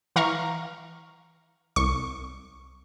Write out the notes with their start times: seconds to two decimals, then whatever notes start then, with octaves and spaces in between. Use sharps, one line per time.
0.16 E3 F5 A#5 C#6 F6
1.76 C2 C#6